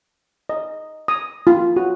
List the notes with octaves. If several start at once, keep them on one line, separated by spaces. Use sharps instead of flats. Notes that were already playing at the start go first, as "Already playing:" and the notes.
D#5
D#6
F4
F#4